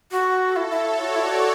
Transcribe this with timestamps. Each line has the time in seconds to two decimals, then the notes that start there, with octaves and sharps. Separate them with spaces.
0.11 F#4 A4
0.41 A4
0.56 E4
0.71 E4 C#5
1.00 F#4 D5
1.15 E4
1.23 F#4